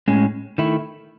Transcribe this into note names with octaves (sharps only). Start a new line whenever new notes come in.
A2 G#3 C#4
D#3 A3 E4